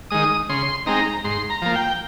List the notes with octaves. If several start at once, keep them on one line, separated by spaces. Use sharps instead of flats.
D#3 G#3 D#6
C#3 C6
G#3 C4 D#4 A#5
G#2 C6
A#5
F3 A#3
G5